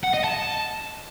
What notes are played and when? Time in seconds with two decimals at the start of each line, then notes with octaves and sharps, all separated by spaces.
0.03 F#5
0.14 D#5
0.24 A5